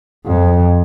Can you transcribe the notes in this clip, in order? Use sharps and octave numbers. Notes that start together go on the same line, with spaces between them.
F2